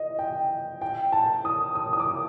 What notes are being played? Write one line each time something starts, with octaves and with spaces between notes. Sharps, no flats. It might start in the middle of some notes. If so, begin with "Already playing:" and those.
Already playing: D#5
G5
G5
A5
D#6
D#6
D#6
D6